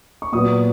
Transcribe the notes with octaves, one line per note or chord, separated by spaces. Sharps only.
C#6
A#2 F#3 B3 D#6